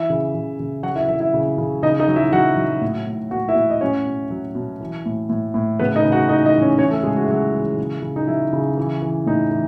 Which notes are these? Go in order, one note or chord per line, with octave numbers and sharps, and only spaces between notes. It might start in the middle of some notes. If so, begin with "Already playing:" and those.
Already playing: E3 E4 E5
C#3
C#3
C#3
F#3 F#4 F#5
E4 E5
F#3 E4 E5
E4 E5
C#3
C#3
C#3 D#4 D#5
D#4 D#5
F#3
E4 E5
F#3 F#4 F#5
F#3
A2
A2
A2 F#4 F#5
E4 E5
A2
D#5
F#3 C#4 C#5
B2
F#3
B2
E3
A2
A2
A2
C#3 B3 B4
D#4 D#5
C#3
F#4 F#5
E3 D#4 D#5
D#4 D#5
E3
C#4 C#5
E3 C#4 C#5
A3 A4
C#3 G#3 G#4
F#4
E4
C#3 F#3 F#4
E3
C#3
C#3
D#4
F#3 E4
C#3
E3
E3
A2 D#4
E3